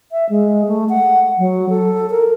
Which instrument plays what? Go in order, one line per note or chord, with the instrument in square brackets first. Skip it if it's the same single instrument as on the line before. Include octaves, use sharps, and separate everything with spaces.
[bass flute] E5
G#3
A3
F#5
F#3
A4
A#4